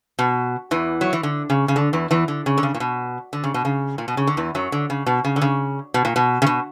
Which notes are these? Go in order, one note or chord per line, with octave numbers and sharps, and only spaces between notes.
B2
E2 E3
F#3
E3
D3
C#3
C#3
D3
E2 E3
E2 E3
D3
C#3
D3
C#3
A#2
B2
D3
C#3
B2
C#3
A#2
B2
C#3
D3
E2 E3
F#2 F#3
D3
C#3
B2
C#3
D3
C#3
B2
A#2
B2
C#3
B2